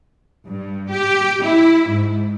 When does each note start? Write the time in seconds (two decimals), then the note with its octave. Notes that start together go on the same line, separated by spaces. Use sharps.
0.48 G2
0.91 G4
1.43 E4
1.90 G#2